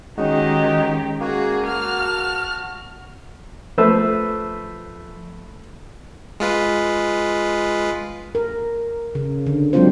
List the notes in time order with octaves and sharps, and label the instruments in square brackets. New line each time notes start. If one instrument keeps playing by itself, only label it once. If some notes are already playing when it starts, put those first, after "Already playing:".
[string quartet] D#3 G4 [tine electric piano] G#3 C#4 [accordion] D#4 [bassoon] F#4
[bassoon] A#3 [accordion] F#4 [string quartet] G#4
[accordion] F#4 [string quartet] A5 F6
[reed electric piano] F3 E6 [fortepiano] A3 B4 C5
[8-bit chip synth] G#3 F4 B4
[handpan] A#4
C#3
D3
F#3 G#3 C4 D4 F4 C5